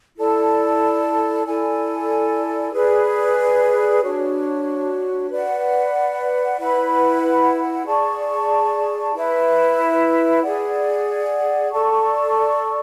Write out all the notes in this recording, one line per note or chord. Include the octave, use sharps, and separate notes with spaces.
E4 A4 D5 A5
E4 A4 D5 G#5
G#4 B4 D5
D4 F#4 C#5
B4 D5 F#5
E4 B4 F#5 B5
G#4 D5 A5 C#6
E4 B4 E5
G#4 D5 F#5
A4 D5 A5 C#6